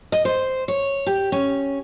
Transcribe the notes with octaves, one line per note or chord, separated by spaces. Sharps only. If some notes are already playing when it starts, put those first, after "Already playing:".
D#5
C5
C#5
G4
C#4